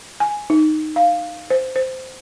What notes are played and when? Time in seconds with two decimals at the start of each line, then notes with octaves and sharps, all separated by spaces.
0.20 G#5
0.50 D#4
0.96 F5
1.50 C5
1.76 C5